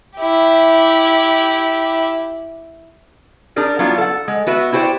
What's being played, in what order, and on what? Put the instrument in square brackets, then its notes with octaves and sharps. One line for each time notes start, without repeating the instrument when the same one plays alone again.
[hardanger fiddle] E4 G4
[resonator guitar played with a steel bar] D4 D#4 G#4 A#4 D5
F#3 G3 B3 D4 E4 F4
A4 F#5
G#3
B3 F#4 B4 E5
E4 F#4 G4 C5 D5